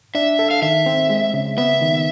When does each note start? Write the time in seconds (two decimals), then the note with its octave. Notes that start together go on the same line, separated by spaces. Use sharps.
0.15 D4 E5
0.39 A4
0.51 F5
0.62 D#3 E5
0.86 C4
1.10 G#3
1.34 C#3
1.58 B3 E5
1.82 D#3